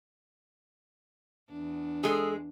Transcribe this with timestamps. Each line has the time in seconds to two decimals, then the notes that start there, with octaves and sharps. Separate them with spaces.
1.49 E2 D4
2.03 G#3 G#4 A4